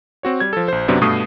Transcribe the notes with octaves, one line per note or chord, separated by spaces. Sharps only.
C4 F#4 C#5
G3 G#6
F3 A4
A#1 C5
F#2 C3 F#3 B3 D4
G2 B2 A3 D#6 C7